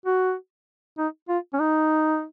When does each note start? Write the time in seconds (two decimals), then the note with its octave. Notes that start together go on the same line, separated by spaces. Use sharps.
0.06 F#4
0.98 D#4
1.29 F4
1.53 C#4
1.59 D#4